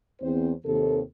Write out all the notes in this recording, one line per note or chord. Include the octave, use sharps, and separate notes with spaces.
E2 C4 C5
D#2 C3 A4